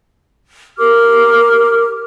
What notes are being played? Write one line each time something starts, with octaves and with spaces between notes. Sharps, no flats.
G4 A#4 D6 F6